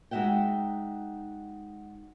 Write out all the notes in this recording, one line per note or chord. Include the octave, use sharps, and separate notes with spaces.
G#3 D#4 F#4 E5 F#5 G5